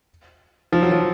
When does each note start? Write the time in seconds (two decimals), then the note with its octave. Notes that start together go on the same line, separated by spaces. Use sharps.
0.72 F3
0.82 F#3
0.92 F3